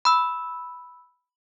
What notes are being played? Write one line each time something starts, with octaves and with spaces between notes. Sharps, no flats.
B5 E6